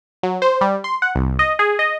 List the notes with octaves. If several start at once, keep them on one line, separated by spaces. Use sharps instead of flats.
F#3
C5
G3
C6
F#5
C2
D#5
G#4
D#5